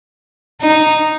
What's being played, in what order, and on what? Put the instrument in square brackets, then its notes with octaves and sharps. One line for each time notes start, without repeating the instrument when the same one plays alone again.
[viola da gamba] D#4